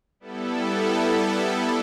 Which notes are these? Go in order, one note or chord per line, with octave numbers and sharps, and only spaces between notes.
G3 B3 E4 A4